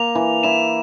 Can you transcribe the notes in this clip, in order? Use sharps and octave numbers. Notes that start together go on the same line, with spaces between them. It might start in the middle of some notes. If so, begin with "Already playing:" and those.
Already playing: A#3 F7
E3
E4 E7